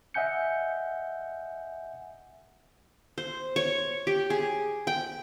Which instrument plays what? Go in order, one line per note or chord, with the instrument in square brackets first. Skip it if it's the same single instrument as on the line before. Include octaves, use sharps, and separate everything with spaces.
[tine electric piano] D#5 E5 F#5 G#5 G6 C#7
[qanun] C5
C#5
G4
G#4
G5